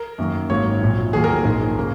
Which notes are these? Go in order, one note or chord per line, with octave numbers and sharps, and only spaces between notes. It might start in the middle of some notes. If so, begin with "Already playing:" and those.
Already playing: A#4
F#2 D#3 A#3
G#1 G#2 F#3 A#3 C#5
A#1 A#2 F#3
D#2 D#3 F#3 A#3 G#4
A#4
A#1 G#2 G#3
C#3 A#3